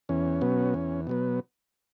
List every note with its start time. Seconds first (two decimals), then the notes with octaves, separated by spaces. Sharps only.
0.09 E2 C#4
0.41 B2 F#3 B3
0.74 E2
1.07 B2 F#3 B3